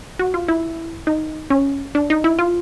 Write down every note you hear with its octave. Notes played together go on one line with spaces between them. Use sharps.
F#4
F4
E4
D#4
C#4
D4
D#4
E4
F4